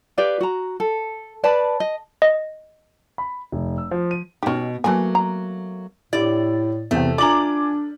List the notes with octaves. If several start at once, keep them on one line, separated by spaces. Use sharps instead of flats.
G4 B4 D5 F5
F#4 A#5
A4
B4 D5 A5 B5
D#5
D#5
B5
F1
E6
F3
D#7
B2 C#4 D#4 G4
E3 F#3 A3 A#3 A4 G#5
A#5
A2 E4 G4 D5
E2 C3 A3 G5
D4 F4 D5 G#5 A#5 D6 F#7